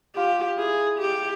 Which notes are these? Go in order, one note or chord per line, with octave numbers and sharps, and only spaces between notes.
F4 G4
E4 G#4
G4